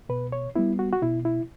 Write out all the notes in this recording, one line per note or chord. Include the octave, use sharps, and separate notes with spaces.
B2 B4
C#5
G3 B3 E4
F#4
F#4
B2 E4
E4